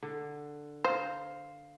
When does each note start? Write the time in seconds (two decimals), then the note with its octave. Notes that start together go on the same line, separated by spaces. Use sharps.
0.03 D3
0.84 C5 F5